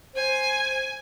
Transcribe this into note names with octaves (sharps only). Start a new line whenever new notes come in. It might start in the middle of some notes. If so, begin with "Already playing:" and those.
C5 G#5